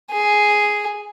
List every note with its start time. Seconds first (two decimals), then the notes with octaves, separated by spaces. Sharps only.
0.11 G#4